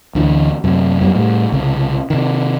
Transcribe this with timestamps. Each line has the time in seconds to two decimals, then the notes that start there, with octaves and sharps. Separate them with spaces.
0.15 D2 D3 E3
0.64 F#2 C3
1.01 F#2 F#3 G3 B3
1.15 A2 G3
1.52 C2 C#3
2.10 C3 D#3